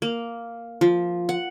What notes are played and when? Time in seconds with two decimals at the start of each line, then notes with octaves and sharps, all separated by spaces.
0.02 A#3
0.81 F3
1.29 F#5